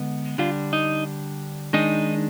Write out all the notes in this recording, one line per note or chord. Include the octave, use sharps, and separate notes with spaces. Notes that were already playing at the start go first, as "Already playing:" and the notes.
Already playing: D3 G#3 B3
D3 G3 D4 F4
D#4
D#3 G#3 D4 D#4